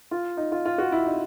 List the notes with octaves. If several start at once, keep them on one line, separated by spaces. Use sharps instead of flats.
F4
D#4
F4
F4
F#4
E4
D#4